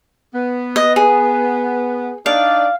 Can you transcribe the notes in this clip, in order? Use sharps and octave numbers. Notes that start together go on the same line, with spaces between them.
B3
D#5
G#4
D4 D#4 D5 F5